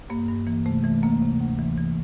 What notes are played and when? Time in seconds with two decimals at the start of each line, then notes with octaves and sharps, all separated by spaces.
0.10 G2 A#3
0.28 G2
0.47 E3 A#3
0.66 C3 A3
0.84 E3 A3
1.02 D2 A#3
1.22 C3
1.40 D2
1.59 E3
1.78 E3